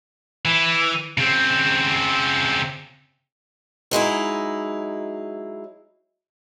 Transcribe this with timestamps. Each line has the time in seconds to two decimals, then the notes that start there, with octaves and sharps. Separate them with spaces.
0.45 E3
1.18 C#3 C4
3.91 F#3 G#3 D#4 E4